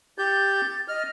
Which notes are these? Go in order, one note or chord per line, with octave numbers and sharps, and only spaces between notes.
G4 G6 A6
D#5 F6